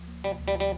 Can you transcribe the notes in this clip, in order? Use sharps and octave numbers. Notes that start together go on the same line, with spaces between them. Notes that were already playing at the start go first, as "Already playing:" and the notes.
Already playing: D2 F3
A#3
C3 G3
D2
G3
F3
G3